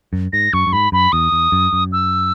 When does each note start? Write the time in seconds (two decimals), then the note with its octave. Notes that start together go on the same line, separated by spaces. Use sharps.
0.13 F#2
0.33 G#2 A#6
0.53 F#2 C#6
0.67 F#2
0.73 G#2 B5
0.92 F#2 B5
1.12 E2 D#6
1.32 E2
1.52 F#2
1.73 F#2
1.92 E6